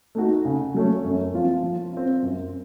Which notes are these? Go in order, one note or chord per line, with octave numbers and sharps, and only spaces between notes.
A3 D#4 F#4
C#3
F#3 A3 C#4
F#2
F3 C4 F4
F3
C4 F4
F#2